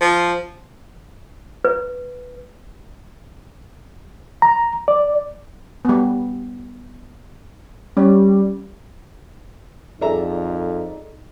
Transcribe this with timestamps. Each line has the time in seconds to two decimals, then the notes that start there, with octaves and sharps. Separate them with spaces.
0.01 F3
1.65 B4
4.42 A#5
4.88 D5
5.85 G3 B3
7.97 G3 C#4
10.01 F2 D#4 G#4 A4 D5 E5 A#5